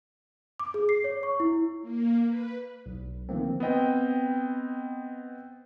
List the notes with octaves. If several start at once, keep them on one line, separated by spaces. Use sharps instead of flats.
D6
G#4
C7
C#5
C#6
E4
A#3
B4
B1
D3 D#3 F3 A3 A#3 C4
B3 C4 D#5 G5